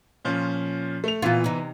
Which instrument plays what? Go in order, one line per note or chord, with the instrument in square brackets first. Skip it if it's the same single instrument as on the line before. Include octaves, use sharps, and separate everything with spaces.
[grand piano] A#2 F3 C#4
A3 F7
[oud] A#2 F4 [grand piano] E3 B3
[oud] C3 D#4